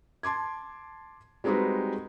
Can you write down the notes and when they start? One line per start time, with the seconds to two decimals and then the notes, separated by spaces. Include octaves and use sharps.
0.23 A5 C6 D6 G#6
1.44 G3 G#3 C4 D#4 F#4 B4